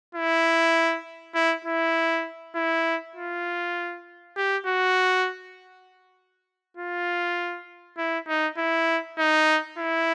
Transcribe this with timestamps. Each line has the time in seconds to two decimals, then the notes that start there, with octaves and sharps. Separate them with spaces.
0.15 E4
1.35 E4
1.65 E4
2.55 E4
3.16 F4
4.36 G4
4.67 F#4
6.77 F4
7.98 E4
8.28 D#4
8.58 E4
9.18 D#4
9.78 E4